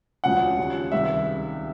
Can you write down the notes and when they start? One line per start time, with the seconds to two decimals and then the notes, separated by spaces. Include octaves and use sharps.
0.24 E1 D2 C#3 F3 F#5
0.58 D#2 C#3 F3
0.92 C#2 C3 D#3 G3 E5